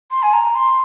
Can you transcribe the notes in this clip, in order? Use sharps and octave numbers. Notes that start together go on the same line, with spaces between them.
C6
G#5
A#5
C6